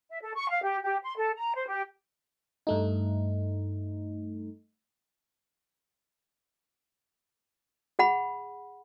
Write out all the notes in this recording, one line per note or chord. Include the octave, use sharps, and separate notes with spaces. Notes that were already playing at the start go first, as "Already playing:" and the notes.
E5
A4
C#6
F5
G4
G4
C6
A4
A#5
C5
G4
G2 A3 D#4
G#4 F#5 B5